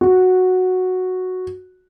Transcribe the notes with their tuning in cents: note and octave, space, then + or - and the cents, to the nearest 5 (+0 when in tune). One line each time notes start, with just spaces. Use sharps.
F#4 -5